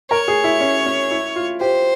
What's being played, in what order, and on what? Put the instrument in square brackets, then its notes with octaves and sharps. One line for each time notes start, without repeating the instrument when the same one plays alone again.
[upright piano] A#4 [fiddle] C#5
[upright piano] G#4
E4
C#4
C#4
E4
F4
[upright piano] G4 [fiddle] C5